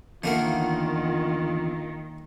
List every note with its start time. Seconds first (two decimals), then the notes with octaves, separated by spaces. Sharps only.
0.24 E2 D3 D#3 A3 A#3 F4 A#4 F#5